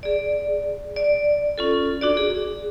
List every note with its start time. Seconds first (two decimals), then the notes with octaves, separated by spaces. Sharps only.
0.03 G#4 D5
0.96 D5
1.58 C#4 F4 A4
2.01 D4 F#4 D5
2.17 G#4